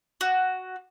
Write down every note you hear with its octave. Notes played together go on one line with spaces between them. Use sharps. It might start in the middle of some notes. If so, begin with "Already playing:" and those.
F#4